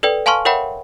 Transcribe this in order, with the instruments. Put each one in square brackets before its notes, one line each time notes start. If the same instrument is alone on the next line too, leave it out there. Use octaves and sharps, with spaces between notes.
[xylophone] A4 B4 D5 G5
F5 G#5 A5 C6 C#6 F6
A#4 C#5 E5 F#5 G5 B5